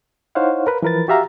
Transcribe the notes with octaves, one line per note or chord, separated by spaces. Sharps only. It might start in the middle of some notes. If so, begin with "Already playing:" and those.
D#4 E4 C5 C#5 F5 F#5
A#4 B4
E3 F3 A#4 B4 A6
F#4 G4 E5 F5 A#5